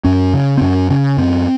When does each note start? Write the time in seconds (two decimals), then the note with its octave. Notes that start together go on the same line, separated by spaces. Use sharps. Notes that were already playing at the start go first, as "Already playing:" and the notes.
0.04 F#2 C#4
0.34 C#3
0.58 C4
0.61 F#2 C#4
0.90 C#3 C#4
1.18 F#2 C4